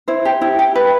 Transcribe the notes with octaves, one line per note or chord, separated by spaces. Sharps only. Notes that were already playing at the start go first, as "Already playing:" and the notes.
E4 C5
G4
E4
G4
B4